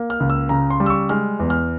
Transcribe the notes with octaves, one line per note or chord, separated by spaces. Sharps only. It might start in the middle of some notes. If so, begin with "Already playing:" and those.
Already playing: A#3
F6
C#2
E6
C#3 A#5
C6
G3
E6
C#6
G#3 F6
E2
F6